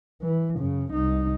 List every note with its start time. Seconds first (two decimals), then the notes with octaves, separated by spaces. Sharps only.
0.21 E3
0.58 F#2 C#3
0.92 C2 D#4